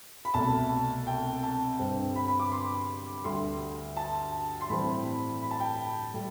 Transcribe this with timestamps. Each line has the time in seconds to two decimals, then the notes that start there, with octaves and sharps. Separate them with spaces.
0.25 B5
0.34 C2 B2 A3 A5
1.07 G5
1.43 A5
1.79 G2 D3 G3 C4
2.16 B5
2.28 B5
2.40 D6
2.52 C6
3.24 D2 D3 G3 C6
3.97 A5
4.61 C6
4.69 A2 E3 G3 C4 B5
5.42 B5
5.51 A5
5.60 G5
6.14 A2 G3